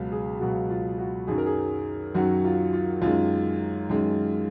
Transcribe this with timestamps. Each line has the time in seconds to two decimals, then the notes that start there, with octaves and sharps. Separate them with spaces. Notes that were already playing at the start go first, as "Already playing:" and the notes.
Already playing: C#2 B2 F#3 F5
0.12 G#4
0.40 C#2 B2 F#3 F#4
0.70 F4
0.98 F#4
1.27 F#2 D#3 F#3 G#4
1.38 A#4
1.46 G#4
2.15 F#2 D#3 F#3 F#4
2.45 F4
2.73 F4
3.02 F#2 D#3 G#3 F4
3.89 F#2 D#3 G#3